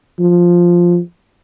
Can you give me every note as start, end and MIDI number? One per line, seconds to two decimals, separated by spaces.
0.20 0.98 53